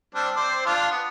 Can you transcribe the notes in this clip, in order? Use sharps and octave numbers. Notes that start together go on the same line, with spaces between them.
G3 C4 D4
C4 C5 D5
D4 F4
B3